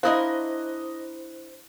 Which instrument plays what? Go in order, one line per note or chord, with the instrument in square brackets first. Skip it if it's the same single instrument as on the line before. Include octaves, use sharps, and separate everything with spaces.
[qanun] D4 E4 A#4 [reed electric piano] C5 [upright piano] D#5 D#6 F#6 [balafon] F5